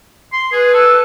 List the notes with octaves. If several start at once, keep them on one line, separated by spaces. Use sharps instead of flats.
C6
G#4 B4
A4